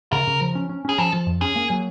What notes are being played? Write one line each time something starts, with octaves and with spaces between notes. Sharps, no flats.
C#3 A#4
C#3
F3
C#4
C#4
C#4 G#4
F3 A4
F3
F2
C#4 G#4
A#3
F#3